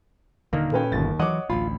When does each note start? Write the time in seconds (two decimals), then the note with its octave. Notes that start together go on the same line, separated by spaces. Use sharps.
0.53 D#1 D3 D#3 A#3
0.72 A#2 C#4 A4 B4 G5
0.92 G1 D#2 A6
1.20 E3 F#3 C#5 D#5 F#5 D6
1.50 A1 D2 F4 B5